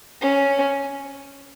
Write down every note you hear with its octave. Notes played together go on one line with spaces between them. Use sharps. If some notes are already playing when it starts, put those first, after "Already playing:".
C#4